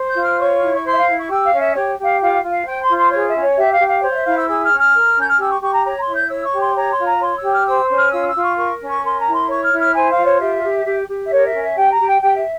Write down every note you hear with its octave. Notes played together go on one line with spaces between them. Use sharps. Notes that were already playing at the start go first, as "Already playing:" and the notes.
Already playing: C5
G6
F4
F6
C#5 C#6
E4
C#6
C5 C6
E5
F5
E4
C#6
G4 E6
F5
C#4
E5
G4 C#5
G4
F5
F4 F5
F4
F5
C5 G5
C6
F4
C6
G#4 C#5
E5
C#4
C#5
G4 E5
F5
G4
F5
C5 C#5
F5
E5
E4 F5
E6
G#4 E6
F6
C#4
F6
A#4
C#4
G6
F6
G4 E6
C#6
G4 C#6
A#5
C#5 A#5
C6
E4
G6
C#5 E6
C#6
G4
C6
C#5 A#5
C6
F4
A#5
C#5 C6
E6
G4
F6
C5 E6
C#4
F6
F4 E6
E6
F4
C#6
A#4 C#6
C#4
C#6
A#4 C6
A#5
E4
C6
C#5 C#6
F6
E4
F6
C5 G#5
F5
F4
C#5
G4 E5
G4
G4
G4
E5
A#4 C#5
E5
C#4
E5
G4 G5
A#5
G4
G5
G4 G5
E5